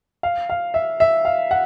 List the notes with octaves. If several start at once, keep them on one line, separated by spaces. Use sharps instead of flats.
F5
F5
E5
E5
F5
F#5